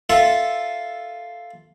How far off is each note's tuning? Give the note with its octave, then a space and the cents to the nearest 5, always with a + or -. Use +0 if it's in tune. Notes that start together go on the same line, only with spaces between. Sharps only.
F4 +0 A4 +0 E5 +0